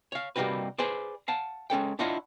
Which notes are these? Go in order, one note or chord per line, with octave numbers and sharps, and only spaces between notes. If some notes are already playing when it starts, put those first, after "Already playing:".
C#5 F5
C3 G3 A#3 D#4 F#4 B4
G#4 B4 C5 D5
F5 F#5 A5
G#3 C#4 A4 G5
D4 E4 F4 C#5 D#5 F#5